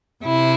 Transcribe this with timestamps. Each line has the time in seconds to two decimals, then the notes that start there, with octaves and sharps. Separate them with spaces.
0.23 C3 E4